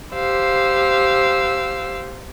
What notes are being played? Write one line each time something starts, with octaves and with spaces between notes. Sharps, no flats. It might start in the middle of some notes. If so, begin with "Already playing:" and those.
G4 C5 F5 E6